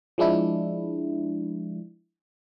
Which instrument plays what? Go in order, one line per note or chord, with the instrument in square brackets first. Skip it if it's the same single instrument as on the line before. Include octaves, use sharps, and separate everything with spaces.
[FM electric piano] F3 G#3 D4 E4